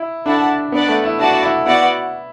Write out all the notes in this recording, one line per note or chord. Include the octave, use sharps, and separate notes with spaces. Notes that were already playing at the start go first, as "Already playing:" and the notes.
Already playing: E4
D4 E4 A4 F#5 A5
B3 D4 B4 D5 F#5
A3
E4
D4 E4 F#4 D5 F#5 A5
E4
B3 E4 F#4 D5 F#5